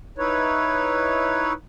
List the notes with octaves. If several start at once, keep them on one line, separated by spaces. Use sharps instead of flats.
D#4 E4 B4 C#5